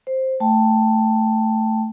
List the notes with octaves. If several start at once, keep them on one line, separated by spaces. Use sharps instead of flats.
C5
A3 G5 A5